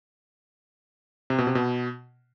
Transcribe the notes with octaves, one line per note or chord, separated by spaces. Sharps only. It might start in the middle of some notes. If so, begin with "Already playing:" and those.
C3
B2
C3
B2